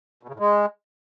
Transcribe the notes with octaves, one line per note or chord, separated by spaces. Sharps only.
B2
C#3
A2
G#3